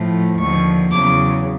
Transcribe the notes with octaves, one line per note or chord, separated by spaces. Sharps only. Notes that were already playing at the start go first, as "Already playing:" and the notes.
Already playing: A2 F3 A3
D#2 D3 F3 C#6
E2 C#3 F#3 D6